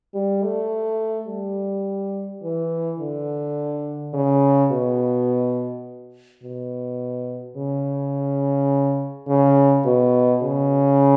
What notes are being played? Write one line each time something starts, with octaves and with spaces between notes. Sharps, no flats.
G3
A3
G3
E3
D3
C#3
B2
B2
C#3
C#3
B2
C#3